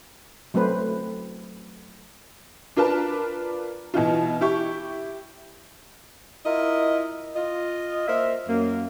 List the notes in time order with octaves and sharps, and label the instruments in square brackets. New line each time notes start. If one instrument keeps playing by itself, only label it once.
[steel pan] F#3 A3 C4 B4 C5
[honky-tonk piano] D4 F4 A#4 B4 A5
B2 E3 D#4 F4
E4 G4 C#6
[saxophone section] E4 F4 A#4 D#5
F4 D#5
A#3 A#4 C5 E5
F#2 A#3